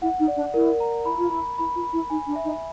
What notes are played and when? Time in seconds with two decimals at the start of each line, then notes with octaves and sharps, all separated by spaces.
0.02 E4 F#5
0.19 D#4
0.28 D5
0.36 D4
0.54 E4 A#4
0.80 A#5
1.06 E4 B5
1.18 F4
1.29 E4 B5
1.58 E4 B5
1.75 F4
1.84 B5
1.92 E4
2.10 D#4 G#5
2.27 D4
2.35 E5
2.44 D#4